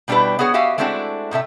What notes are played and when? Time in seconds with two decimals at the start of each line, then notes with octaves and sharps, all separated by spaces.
0.08 B2 G3 D4 E4 G4 B4
0.39 B3 F#4 G#4 C#5 F#5
0.54 F#4 G4 E5 F5 G#5
0.78 G#3 A3 C4 D4 E4 F#4
1.31 A2 C3 A3 E5